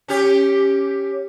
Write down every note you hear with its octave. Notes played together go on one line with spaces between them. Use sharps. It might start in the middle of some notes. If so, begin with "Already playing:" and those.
C#4 G4